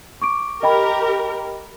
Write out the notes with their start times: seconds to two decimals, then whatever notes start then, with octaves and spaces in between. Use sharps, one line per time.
0.22 C#6 D6 D7
0.63 G4 A#4 D#5 G5 B5